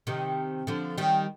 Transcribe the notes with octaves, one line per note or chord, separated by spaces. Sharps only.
C3 D#3
D3 F3
D#3 G3